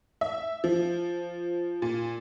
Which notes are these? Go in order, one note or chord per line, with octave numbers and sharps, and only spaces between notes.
E5
F3
A#2